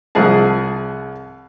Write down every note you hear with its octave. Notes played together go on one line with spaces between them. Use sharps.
C2 F3 G#4 A5